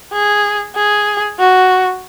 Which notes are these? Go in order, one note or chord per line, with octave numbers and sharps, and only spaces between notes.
G#4
G#4
F#4